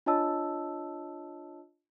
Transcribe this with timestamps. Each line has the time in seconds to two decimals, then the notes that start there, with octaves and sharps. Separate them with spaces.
0.06 D4 F4 C#5 D#5 A5 E6